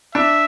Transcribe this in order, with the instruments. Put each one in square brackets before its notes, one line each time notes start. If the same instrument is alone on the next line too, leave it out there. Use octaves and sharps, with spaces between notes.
[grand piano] D4 [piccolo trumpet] E5